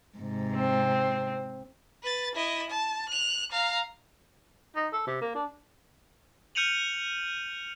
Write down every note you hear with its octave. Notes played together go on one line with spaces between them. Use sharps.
G#2 C3
C4
B4 A6
E4 D#5
A5
F#6 F7
F5 A#5
D#4
A4
C3
A#3
D4
F6 G6 C#7 D#7 F7 F#7